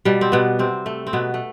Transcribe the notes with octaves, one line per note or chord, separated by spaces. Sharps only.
B2 G3
C4
B2 B3
C3 C4
A3
C4
B2 B3
A3